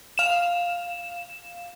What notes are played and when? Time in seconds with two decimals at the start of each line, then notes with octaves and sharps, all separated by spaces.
0.18 F5 E7